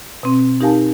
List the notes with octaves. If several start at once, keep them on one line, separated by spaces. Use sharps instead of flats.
B2 C4
D#4 G4 A#4 F5 G#5 A5